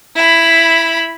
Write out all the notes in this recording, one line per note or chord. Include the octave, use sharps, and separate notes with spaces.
E4 B5